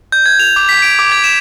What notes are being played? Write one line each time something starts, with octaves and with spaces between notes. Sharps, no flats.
G6
G#6
F7
D6
B6
D7
D6
G#6
E7